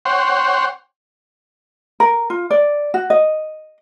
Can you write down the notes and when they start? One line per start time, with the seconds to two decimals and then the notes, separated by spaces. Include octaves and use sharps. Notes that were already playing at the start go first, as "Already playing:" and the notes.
0.05 C5 C#5 F#5 G5 C6
2.00 A#4
2.30 F4
2.51 D5
2.94 F#4
3.10 D#5